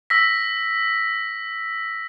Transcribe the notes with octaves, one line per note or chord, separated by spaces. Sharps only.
E6 A#6 B6